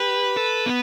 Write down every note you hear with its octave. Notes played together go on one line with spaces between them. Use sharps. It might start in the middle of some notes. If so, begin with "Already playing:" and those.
Already playing: G4 B4
A4
B3